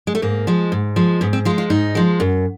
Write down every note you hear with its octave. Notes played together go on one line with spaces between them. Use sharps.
G#3
A3
G#2 A#3
F3 G#3
G#2
F3 G#3
G#2 B3
C4
F3 G#3 F4
F4
G#2 D#4
F3 G#3
F#2